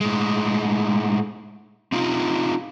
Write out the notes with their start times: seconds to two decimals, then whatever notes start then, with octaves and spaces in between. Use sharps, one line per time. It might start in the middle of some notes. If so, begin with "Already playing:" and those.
0.01 A2 G#3
1.92 C4 D#4 F4